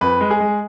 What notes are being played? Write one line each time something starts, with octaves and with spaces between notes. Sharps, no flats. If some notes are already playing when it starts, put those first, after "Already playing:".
F2 B4
G#3
G#4
G#3